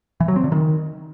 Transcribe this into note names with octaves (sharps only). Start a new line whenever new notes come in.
E3
F#3
C4
D3
D#3